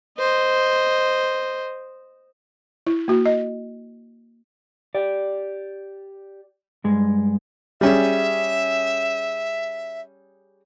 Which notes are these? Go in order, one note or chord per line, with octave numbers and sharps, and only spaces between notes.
C5 D#5
E4
A#3 F#4
D#5
G4 D5
G2 G#3
G3 C#4 G#4 E5